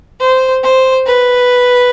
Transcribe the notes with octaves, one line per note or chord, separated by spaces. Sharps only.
C5
C5
B4